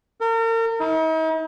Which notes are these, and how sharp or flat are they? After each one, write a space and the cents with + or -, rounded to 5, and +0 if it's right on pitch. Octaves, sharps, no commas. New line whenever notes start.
A#4 -40
D#4 +45